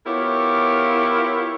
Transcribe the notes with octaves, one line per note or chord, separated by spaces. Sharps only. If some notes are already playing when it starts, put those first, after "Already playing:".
B3 E4 F4 G4 A#4 C#5